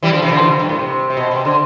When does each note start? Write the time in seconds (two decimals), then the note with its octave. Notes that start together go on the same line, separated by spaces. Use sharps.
0.03 E3 G3
0.13 D3 F3
0.22 C3 E3
0.32 D3 F3
0.41 C3 E3
0.50 D3
0.60 G2
0.69 A2
0.79 C3
1.10 C3
1.17 B2
1.31 C3
1.45 D3